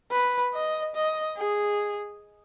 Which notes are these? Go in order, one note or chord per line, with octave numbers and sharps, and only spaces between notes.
B4
D#5
D#5
G#4